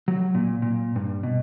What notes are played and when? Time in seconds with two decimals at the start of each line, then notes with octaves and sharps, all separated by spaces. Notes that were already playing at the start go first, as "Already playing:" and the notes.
0.08 F#3
0.35 A#2
0.62 A#2
0.96 G2
1.23 B2